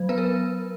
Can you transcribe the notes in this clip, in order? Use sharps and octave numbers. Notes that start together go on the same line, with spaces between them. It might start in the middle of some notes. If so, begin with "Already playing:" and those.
Already playing: F#3
B3 B4
A#4